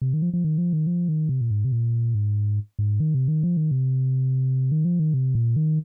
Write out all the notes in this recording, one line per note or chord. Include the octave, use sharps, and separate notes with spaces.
C3
D#3
F3
F3
D#3
F3
D#3
F3
D#3
C3
A#2
G#2
C3
A#2
G#2
G#2
D#3
C3
D#3
F3
D#3
C3
D#3
F3
D#3
C3
A#2
D#3